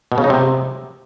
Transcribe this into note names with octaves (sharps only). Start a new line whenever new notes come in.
B2
C#3
D#4
C3